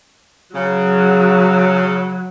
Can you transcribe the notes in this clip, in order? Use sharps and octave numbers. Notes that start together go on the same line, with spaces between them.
C#3 F#3